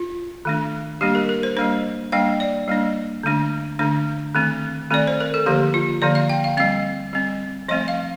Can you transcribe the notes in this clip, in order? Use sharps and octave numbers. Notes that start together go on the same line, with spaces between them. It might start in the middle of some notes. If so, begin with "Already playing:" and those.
Already playing: F4
D#3 A3 D4
G3 A#3 D4 G4
A#4
A#4
C5
G3 A#3 D4 C5
G3 A#3 D4 G5
D5
G3 A#3 D4
D3 A3 D4
D3 A3 D4
D#3 A3 C4
D#3 A3 C4 D5
C5
A#4
A4
D3 F3 A#3 G4
F4
D3 F3 A#3 D5
F5
G5
F5
G3 C4 F5
G3 C4
F3 A3 C4 D#5
F5